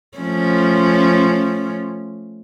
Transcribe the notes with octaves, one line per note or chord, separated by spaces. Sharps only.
F3 A3 C#4